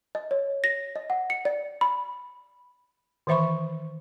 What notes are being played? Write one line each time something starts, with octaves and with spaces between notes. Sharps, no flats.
D#5
C#5
A#6
D#5
F#5
C#7
D5
B5
D#3 E3 C5 E5 B5 C#6